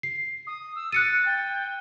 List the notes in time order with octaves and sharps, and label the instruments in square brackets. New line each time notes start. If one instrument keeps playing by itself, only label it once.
[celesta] C7
[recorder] D#6
E6
[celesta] F#6 C#7 D#7 [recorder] A6
[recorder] G5